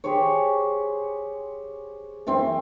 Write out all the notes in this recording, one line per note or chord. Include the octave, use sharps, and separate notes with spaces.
G4 G#4 C5 C#5
F#2 E3 C4 E4